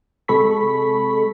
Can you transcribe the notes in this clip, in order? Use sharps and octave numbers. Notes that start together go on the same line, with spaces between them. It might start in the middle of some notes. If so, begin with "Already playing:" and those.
C3 G#3 A4 B5 C#6 B6